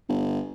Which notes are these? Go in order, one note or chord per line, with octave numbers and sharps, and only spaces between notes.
G1